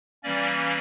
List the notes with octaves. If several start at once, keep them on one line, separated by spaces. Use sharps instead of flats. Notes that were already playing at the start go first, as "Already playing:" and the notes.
E3 G3 A#3 C#4 D5